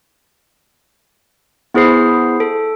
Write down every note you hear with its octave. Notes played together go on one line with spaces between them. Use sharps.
B3 E4 G#4 C5 C7
A4